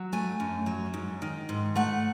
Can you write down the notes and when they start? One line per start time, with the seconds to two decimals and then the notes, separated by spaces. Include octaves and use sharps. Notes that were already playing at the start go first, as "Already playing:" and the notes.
Already playing: F#3
0.13 A3 G#5
0.40 F#2
0.66 F#3
0.94 G#2
1.22 D#3
1.49 G#2
1.76 A3 F#5